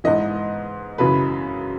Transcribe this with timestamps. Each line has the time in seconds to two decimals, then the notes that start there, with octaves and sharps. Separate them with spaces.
0.04 G#2 E3 D#5
0.98 F#2 C#3 E3 B4